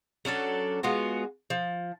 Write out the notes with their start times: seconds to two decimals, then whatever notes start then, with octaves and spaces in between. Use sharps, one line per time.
0.25 F#3 C#4 D4 A4
0.83 G#3 B3 F4 F#4
1.50 F3